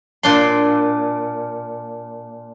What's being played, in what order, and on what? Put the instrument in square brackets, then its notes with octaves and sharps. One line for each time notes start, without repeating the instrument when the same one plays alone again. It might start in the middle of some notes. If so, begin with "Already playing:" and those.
[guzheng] A#2 D4 C6